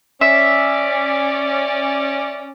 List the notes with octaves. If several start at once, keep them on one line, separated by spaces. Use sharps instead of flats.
C#4 D5 E5